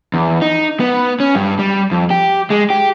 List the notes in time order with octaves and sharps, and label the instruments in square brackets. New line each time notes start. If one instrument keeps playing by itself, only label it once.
[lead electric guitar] E2
D#4
B3
C#4
G2
G3
F2
G4
G#3
G4